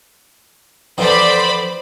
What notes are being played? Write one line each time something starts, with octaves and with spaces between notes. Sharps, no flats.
F2 D3 E3 C5 D5 B5